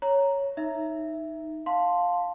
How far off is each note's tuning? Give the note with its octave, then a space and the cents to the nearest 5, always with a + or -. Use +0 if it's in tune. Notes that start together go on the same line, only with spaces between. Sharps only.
C#5 +0 A#5 -5
D#4 +0 E5 +0
F5 +15 A5 +0 C6 +0